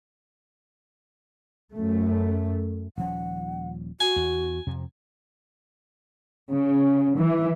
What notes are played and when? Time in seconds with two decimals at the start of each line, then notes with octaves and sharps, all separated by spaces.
1.73 F#2 A3
2.98 D#1 F3 C#4 F#5
4.00 F#4 G#5
4.16 E2
4.67 F2 C3
6.51 C#3
7.18 E3